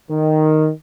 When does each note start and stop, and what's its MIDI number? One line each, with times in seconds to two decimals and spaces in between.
0.10 0.69 51